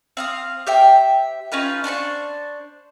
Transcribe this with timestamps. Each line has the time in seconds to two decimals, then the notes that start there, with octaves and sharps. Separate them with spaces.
0.17 C4 F5 D#6
0.67 G4 C5 E5 G5
1.52 C#4 D#4 F4 B4
1.84 D4 C5 C6 C#6